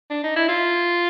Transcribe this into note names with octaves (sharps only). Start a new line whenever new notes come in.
D4
D#4
E4
F4